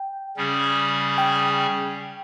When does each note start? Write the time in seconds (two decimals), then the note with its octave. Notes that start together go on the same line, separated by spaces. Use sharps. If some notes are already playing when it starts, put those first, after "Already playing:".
Already playing: G5
0.37 C#3 G3 C#4 G#4
1.18 G5